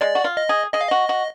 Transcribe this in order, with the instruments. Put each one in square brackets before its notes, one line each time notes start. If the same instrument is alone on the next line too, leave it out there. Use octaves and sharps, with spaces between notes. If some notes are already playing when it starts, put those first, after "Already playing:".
[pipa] G#3 [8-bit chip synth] D5
[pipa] F#4
F4
[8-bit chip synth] D#5
[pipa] G#4
[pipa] G#4 [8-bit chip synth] D#5
[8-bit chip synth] F5
[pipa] F#4 [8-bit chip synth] D#5
[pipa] F#4